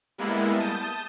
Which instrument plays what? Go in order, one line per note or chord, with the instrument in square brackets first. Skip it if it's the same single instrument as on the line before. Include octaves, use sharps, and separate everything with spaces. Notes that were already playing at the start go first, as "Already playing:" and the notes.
[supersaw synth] G3 G#3 A#3 B3 E4
A5 D#6 G6